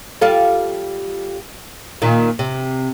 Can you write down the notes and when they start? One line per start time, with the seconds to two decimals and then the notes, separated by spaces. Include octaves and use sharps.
0.21 G3 F4 A4
2.02 A#2 D#3
2.39 C3